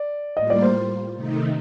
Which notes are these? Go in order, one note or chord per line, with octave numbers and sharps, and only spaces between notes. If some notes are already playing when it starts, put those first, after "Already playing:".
Already playing: D5
A2 G3 A#3 F4 D#5
D5
C5
C3 D#3 A3 D#4